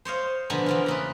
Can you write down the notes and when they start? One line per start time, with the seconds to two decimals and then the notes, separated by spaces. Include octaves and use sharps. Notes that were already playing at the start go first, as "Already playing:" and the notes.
0.05 C5 C#5 D#5 F5
0.50 B2 D3 F3 A#3 B3 G#5
0.66 E2 A#3 F4
0.86 C#3 A#3 B4